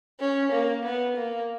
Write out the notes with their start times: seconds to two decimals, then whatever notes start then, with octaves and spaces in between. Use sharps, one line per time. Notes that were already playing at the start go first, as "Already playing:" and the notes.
0.20 C#4
0.52 A#3
0.84 B3
1.16 A#3